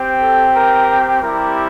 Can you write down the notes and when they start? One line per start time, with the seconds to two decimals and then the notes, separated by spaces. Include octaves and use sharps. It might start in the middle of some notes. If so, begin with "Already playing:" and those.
Already playing: C4 G4
0.21 A4
0.55 A#4
1.22 G3 C4 E4 G4 A#4